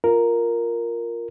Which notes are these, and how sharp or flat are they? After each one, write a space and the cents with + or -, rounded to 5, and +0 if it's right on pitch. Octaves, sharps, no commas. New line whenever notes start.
F4 +0 A#4 +0